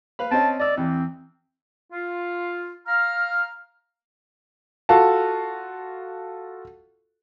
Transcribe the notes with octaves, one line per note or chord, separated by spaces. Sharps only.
B4 F5 B5
C4 C#4 D#5 A5
D5 D#5 E6
E2 C4
F4
F5 A#5 F6
F4 F#4 A4 F5 A5